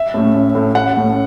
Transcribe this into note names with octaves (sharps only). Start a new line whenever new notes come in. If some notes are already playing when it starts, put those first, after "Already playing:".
Already playing: E5
A2 A3 C#4
A1
A2 A3 C#4
A1 F#5
A2 A3 C#4